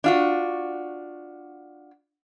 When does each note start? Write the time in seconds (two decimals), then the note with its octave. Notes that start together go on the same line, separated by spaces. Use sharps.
0.04 D4 F4 F#4